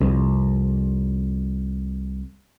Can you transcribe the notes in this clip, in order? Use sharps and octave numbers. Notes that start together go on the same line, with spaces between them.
C2 F2